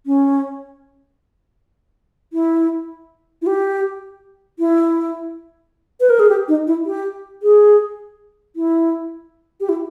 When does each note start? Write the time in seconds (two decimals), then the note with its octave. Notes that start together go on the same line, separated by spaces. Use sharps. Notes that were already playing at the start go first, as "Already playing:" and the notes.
0.06 C#4
2.33 E4
3.42 E4
3.47 G4
4.59 E4
6.00 B4
6.10 A#4
6.20 G#4
6.29 G4
6.48 D#4
6.67 E4
6.86 G4
7.43 G#4
8.56 E4
9.60 G4
9.69 E4